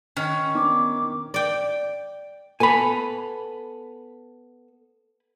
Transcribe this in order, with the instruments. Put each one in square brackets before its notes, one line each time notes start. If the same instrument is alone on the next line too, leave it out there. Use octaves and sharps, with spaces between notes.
[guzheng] D#3 [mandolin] C#4
[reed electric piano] B3 D4 D#4 [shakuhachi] D6
[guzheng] D5 G5
[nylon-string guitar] B3 A4 [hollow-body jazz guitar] G#5 B5